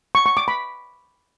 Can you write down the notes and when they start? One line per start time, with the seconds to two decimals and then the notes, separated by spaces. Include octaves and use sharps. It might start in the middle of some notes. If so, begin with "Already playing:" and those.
0.15 C#6
0.26 C#6
0.37 D6
0.48 B5